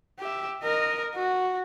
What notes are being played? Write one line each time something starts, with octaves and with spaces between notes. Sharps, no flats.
G4 E5
A#4 D#5
F#4